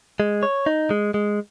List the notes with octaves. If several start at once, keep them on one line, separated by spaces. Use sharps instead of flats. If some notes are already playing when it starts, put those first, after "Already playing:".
G#3
C#5
D#4
G#3
G#3